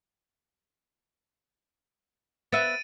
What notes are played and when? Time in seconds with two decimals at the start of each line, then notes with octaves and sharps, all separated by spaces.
2.52 B3 E5 A6 D7 D#7